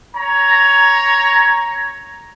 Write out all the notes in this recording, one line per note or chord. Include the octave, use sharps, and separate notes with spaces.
C#5 A#5